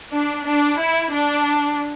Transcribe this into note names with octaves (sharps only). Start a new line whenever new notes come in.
D4
D4
E4
D4